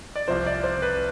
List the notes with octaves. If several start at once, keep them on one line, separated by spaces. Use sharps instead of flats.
D5
C2 C3 F3 C5
D5
C5
B4